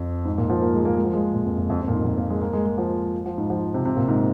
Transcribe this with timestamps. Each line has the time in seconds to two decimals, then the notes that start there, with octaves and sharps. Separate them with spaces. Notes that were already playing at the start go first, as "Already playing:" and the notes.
Already playing: F2
0.25 G#2
0.38 A#2
0.50 F3
0.62 A#3
0.74 G#3
0.85 A#3
0.94 G#3
1.05 F3
1.13 G#3
1.34 A#2
1.45 F2
1.58 F2
1.70 F2
1.82 F2
1.88 A#2
1.93 G#2
2.05 A#2
2.18 A#3
2.30 G#3
2.41 A#3
2.53 G#3
2.66 G#3
2.78 F3
3.26 F3
3.38 G#2
3.50 F3
3.74 C3
3.85 C3
3.97 A#2
4.08 G#2